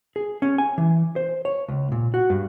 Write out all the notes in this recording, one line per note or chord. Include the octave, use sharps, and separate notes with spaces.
G#4
C#4
G#5
E3
C5
C#5
C#2
A#2
F#4
G2